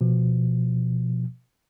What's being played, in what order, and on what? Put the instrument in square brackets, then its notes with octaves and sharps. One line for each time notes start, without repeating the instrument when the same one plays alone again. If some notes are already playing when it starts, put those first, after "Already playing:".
[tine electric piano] B2 F3